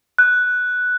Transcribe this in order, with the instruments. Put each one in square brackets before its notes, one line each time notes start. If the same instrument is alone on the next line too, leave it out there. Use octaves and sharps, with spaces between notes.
[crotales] F#6